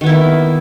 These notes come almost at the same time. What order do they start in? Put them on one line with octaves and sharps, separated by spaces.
D#3 B3 E4 A#3